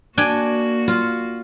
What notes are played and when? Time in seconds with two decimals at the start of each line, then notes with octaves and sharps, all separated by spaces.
0.18 A#3 D4 F#4 G5 G#5
0.88 F4